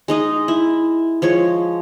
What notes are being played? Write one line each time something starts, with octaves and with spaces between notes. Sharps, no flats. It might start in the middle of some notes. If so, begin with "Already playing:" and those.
G#3 D#4 D#5
E4
F3 G#3 C#5